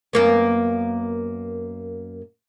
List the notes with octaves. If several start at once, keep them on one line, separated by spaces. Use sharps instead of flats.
F#2 A#3 B3